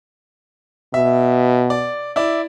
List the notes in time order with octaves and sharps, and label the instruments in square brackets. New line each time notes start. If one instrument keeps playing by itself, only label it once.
[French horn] B2 [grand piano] E5
[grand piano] D5
E4 D5